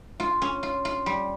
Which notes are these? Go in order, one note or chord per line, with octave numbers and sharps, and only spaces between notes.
F4
C#4
F4
F4
G3